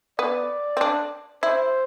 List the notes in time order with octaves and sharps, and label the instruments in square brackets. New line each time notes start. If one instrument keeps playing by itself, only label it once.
[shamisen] B3 [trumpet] D5
[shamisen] C4
D4
[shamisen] E4 [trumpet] C5